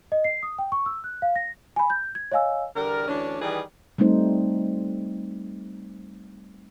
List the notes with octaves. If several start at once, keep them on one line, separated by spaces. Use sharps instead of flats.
D#5
C7
D#6
G5
C#6
E6
F#6
F5
A#6
G#5 B5
G6
G#6
C#5 D#5 F5 G#5 E6
E2 D3 G3 A#4
D2 E3 C#4 D4
D#3 E3 G3 D#4 G#4 B4
G3 A3 C4 D#4 C5